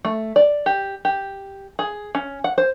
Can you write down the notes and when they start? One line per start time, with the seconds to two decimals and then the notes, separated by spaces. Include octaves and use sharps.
0.05 A3
0.36 D5
0.66 G4
1.05 G4
1.79 G#4
2.15 C#4
2.44 F#5
2.58 C5